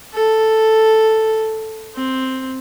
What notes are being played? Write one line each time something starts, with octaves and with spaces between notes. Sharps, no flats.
A4
C4